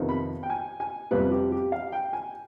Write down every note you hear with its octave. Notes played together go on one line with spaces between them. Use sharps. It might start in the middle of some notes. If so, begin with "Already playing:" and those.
Already playing: F2 C3 D#3 B3 D#4
B5
G5
G#5
G#5
F2 C3 G3 B3 B4
G4
G4
F5
G5
G#5